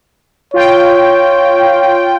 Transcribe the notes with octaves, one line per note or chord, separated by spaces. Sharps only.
F4 C#5 G5